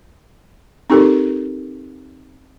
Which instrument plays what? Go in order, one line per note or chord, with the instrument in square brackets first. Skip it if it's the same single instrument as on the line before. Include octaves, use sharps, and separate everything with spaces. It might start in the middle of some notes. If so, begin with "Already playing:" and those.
[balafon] C4 D#4 G4 A4 A#4